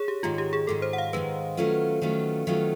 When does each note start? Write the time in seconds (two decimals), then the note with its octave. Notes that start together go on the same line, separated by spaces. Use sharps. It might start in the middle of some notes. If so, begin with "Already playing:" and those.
Already playing: G#4 C#5
0.08 G4
0.23 G#2 D#3 G#3 F4
0.38 G4
0.53 G#4
0.67 G#2 D#3 G#3 A4
0.82 C5
0.93 F#5
0.98 F5
1.13 G#2 D#3 G#3 B4
1.57 D#3 F#3 A3 C#4 F4
2.02 D#3 F#3 A3 C#4 F4
2.47 D#3 F#3 A3 C#4 F4